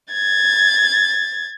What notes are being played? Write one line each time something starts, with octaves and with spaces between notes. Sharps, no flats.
G#6 A6